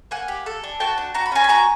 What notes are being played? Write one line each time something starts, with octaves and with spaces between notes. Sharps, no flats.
A#3 F#5 G#5
G4
A4
D4
F#4 G5 A5
D4
F#4 A#5
B5
C#4 G#5 A#5
B5
F#4 G#5 A#5